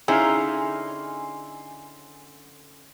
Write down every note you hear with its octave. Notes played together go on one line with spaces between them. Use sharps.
D3 C#4 D#4 E4 G#4 F5 G#5 C6